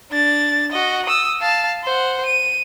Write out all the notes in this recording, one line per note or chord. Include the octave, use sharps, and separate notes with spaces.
D4 A6
F#4 D#5
D#6 E6
F5 A5
C5 F#5
D#7